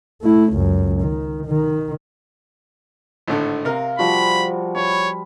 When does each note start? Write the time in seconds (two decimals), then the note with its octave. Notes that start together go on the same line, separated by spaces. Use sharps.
0.22 A3 E4
0.54 C#2 F#2
1.02 D#3
1.47 D#3
3.28 G#1 A2 D3
3.65 C3 A#4 F5
3.99 F3 G3 F#4 B5
4.76 C#5 B5